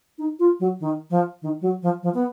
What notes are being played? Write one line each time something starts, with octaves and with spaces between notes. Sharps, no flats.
D#4
F4
F#3
D#3
F3
D#3
F#3
F3
F3
B3